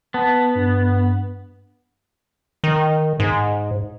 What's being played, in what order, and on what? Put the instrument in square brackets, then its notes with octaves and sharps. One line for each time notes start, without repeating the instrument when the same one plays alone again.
[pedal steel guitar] B3 [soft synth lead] A5
[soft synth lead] G2
[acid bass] D#3
G#2